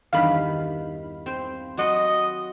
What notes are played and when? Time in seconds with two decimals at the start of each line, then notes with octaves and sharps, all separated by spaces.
0.13 E2 G2 D#3 F5 B5
1.26 C4 C5
1.77 F#3 D#5 F#5 C6